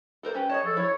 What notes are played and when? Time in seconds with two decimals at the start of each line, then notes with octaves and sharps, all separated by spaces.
0.23 A4 A#4 C5
0.35 C#4 G4 B4
0.50 G#4 C#5 D#5 A5
0.65 F3 A4
0.77 E4 C#5